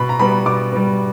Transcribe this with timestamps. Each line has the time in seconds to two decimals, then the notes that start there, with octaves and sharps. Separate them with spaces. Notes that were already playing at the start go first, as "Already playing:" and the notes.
Already playing: B2 B5
0.09 A#5
0.19 G3 B3 B5
0.46 B2 D6
0.72 G3 B3